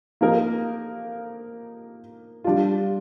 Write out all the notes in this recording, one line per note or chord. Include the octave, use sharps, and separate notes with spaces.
F3 A#3 D#4 A#4
G3 D4 F4